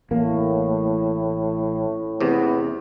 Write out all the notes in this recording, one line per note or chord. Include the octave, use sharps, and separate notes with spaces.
A1 A2 A#3
A1 E2 C3 B3